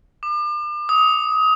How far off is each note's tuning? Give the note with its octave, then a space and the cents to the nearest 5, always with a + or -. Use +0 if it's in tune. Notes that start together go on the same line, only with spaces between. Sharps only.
D6 +40
D#6 +25